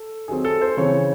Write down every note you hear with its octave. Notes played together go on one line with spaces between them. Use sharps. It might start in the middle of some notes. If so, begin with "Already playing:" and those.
Already playing: A4
D#3 F#3 C4 G#4
A4
C5
C#3 E3 C4 C#5